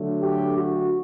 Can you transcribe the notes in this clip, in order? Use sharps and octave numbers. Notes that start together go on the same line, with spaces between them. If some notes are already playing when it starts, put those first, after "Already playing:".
Already playing: D3 F#3 A3
G4
F#4